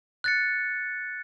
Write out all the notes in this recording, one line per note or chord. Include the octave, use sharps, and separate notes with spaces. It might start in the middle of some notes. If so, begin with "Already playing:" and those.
F#6 A6 C#7